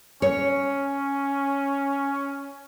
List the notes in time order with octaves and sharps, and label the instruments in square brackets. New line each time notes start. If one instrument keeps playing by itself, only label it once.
[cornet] C#4 [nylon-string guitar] C#5